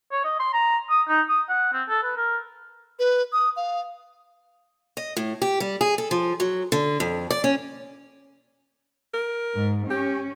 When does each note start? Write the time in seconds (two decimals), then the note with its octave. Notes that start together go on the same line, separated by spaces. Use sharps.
0.12 C#5
0.24 D#5
0.40 C6
0.54 A#5
0.90 D#6
1.08 D#4
1.29 D#6
1.49 F#5
1.73 C4
1.89 A4
2.03 B4
2.17 A#4
2.99 B4
3.33 D#6
3.57 F5
4.97 D#5
5.17 A2
5.42 G4
5.60 G3
5.81 G#4
5.98 A4
6.11 F3
6.40 F#3
6.72 D3
7.00 F2
7.31 D5
7.44 C#4
9.14 A#4
9.54 G#2
9.90 C#4 G4